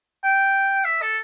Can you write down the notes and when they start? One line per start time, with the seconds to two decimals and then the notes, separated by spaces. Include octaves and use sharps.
0.24 G5
0.85 E5
1.02 A4